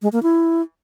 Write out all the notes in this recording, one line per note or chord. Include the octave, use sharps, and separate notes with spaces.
G#3
A#3
E4